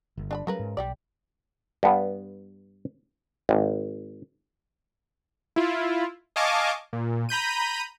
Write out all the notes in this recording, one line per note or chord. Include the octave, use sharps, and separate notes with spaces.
G1
D4 A5 B5
C#3 F#3 G3 A#4 B4
G#2
B1 G3 G4 D5
G2 B3
G#1
E4 F4
D#5 F5 G#5 A5 C#6 D6
A#2
A#5 B5 G6 D#7